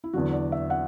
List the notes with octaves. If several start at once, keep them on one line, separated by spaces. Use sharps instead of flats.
E4
E2 D3 F#3 F#4
D5
E5
F#5